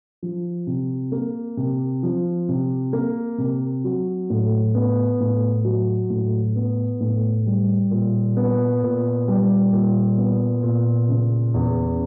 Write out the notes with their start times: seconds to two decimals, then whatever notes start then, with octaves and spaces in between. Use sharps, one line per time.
0.23 F3
0.67 C3
1.12 A#3
1.57 C3
2.03 F3
2.49 C3
2.93 A#3
3.38 C3
3.84 F#3
4.30 A2
4.75 B3
5.20 A2
5.65 F#3
6.10 A2
6.56 B3
7.00 A2
7.46 G3
7.91 A#2
8.37 B3
8.83 A#2
9.28 G3
9.73 A#2
10.18 B3
10.63 A#2
11.09 C#3
11.54 E2